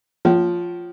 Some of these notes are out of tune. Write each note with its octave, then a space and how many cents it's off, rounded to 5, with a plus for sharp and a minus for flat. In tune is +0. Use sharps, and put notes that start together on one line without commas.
F3 +0 C#5 +0 G5 -45